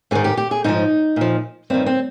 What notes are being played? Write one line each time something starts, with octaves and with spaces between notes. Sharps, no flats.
G#2 D#3 G#4
G4
G4
G#4
G#2 F3 D#4
A#2 F3
G2 D#3 C4
C4